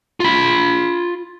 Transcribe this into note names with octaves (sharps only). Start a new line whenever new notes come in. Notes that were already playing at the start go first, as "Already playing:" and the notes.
F4 B5